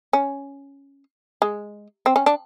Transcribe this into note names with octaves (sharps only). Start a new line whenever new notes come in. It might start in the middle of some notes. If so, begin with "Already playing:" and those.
C#4
G#3
C4
C#4
D4